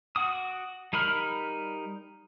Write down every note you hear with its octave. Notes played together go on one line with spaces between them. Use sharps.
F#4 F#5 D6 D#6
G3 D#4 A#4 B5 F6